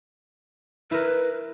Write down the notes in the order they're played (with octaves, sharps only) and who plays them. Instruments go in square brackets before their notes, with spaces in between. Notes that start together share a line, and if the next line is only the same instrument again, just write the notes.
[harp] E4 A#4 [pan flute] B4